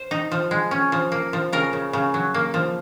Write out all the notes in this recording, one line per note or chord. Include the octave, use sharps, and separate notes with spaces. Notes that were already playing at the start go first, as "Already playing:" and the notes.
Already playing: C5
D#4
F3
G#3
C#4
F3
A#3
F3
C#3 A#4
C#3
C#3
F#3
A#3
F3